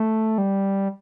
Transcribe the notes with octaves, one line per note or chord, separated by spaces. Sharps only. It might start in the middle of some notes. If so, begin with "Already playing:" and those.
Already playing: A3
G3